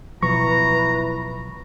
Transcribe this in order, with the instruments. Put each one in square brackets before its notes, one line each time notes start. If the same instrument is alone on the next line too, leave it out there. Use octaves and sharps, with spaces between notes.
[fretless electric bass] B2 F3 F#3 [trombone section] E4 B4 [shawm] A#5 [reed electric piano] C#6